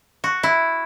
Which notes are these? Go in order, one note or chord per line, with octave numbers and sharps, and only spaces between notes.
F#4
E4